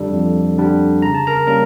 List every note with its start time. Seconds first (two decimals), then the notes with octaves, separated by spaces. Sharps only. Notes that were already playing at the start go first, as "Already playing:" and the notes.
Already playing: F2 D3 G3 D4 A4
0.13 F2
0.58 D3 G3 D4
1.02 C#3 A#5
1.15 A5
1.27 A#4 A#5
1.47 G3 A#3 C#4 A#4 A#5